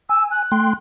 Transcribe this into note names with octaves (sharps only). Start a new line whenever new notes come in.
G#5 E6
F#6
A3 G5 C6